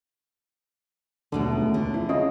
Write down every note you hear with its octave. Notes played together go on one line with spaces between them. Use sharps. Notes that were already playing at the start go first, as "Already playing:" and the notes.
D#2 B2 D3 A3
C#2
C#2 D3
F2 E4
C#3 C#4 F4 D#5